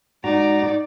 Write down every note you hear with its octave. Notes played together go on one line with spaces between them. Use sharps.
G#2 D#4 F#4 D5 A#5